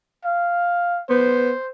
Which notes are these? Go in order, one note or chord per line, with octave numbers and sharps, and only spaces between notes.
F5
B3 C5